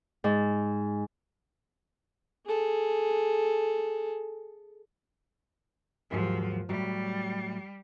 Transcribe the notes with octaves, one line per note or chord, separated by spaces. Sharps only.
G#2
G#4 A4
D#2 G#2 F3 F#3
A2 F#3 G3